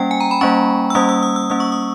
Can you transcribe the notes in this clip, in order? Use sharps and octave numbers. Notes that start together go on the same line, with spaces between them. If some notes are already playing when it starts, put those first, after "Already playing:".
Already playing: G3 A#3 C#4 G5
G#5
A#5
B5
G3 A#3 C#4 C#6
E6
G3 A#3 C#4 D#6
E6
D#6
E6
G3 A#3 C#4 D#6
C#6
D#6